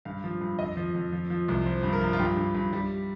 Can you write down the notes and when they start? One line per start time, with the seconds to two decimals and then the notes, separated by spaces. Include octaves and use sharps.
0.05 G2 F5
0.24 F3
0.41 G2
0.59 F2 D#5
0.77 F3
0.94 F2
1.12 F3
1.30 F3
1.48 C2
1.66 F3 C5
1.83 G2
1.93 A#4
2.01 F3
2.13 F4
2.19 G2 G4
2.37 G2
2.55 G2
2.73 G3